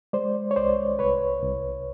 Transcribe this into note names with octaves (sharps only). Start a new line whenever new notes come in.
G#3 C5 D5
C#5
C2 C5 D5
C2 B4 C#5
C2